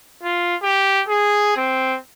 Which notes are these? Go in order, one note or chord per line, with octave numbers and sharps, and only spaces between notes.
F4
G4
G#4
C4